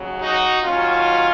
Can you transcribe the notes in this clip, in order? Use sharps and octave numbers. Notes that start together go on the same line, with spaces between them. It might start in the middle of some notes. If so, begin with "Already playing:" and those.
Already playing: D#2 C#3 F#3
D#4 F#4
D#2 D#3 F#3 C#4 F4